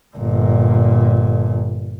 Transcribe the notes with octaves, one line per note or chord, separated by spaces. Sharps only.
G1 A#2